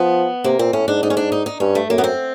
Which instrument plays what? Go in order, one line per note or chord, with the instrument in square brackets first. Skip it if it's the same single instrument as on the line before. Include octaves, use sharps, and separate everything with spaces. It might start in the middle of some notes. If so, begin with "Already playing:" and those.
Already playing: [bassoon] F3 [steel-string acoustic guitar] B3
[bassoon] C3 [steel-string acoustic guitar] A#3
[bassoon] A#2 [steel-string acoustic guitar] C4
[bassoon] A2 [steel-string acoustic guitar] C#4
[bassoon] G#2 [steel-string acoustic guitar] D4
[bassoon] G#2 [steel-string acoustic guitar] D#4
[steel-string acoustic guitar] C#4
D4
D#4
D#4
[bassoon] G2 [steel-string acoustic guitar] C#4
[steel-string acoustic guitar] A3
[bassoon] F#2 [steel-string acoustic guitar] A#3
[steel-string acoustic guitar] B3
C4